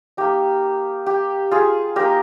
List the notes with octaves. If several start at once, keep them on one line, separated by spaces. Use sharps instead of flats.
A#3 D#4 G4
G4
F4 G#4
A#3 D#4 G4 A#4